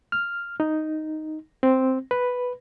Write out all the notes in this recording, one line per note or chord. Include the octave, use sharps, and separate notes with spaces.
F6
D#4
C4
B4